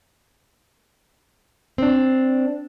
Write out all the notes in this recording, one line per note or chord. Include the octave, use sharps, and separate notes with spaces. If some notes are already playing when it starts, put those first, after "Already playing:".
C4 D4